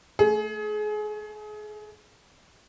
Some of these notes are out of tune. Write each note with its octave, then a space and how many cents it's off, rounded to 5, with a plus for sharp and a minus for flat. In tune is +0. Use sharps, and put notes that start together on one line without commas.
A3 +0 G#4 +30